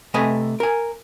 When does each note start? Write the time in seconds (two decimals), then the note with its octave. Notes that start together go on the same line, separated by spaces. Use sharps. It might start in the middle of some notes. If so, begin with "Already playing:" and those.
0.14 C3 A3 B4 D#5 G#5
0.60 A#4 G#5